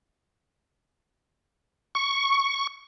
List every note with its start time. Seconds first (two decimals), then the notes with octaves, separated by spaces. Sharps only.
1.95 C#6